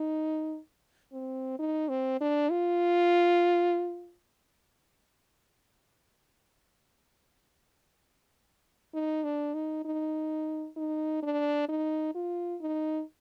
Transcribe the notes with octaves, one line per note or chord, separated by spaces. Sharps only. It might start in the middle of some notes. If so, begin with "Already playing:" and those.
Already playing: D#4
C4
D#4
C4
D4
F4
D#4
D4
D#4
D#4
D#4
D4
D#4
F4
D#4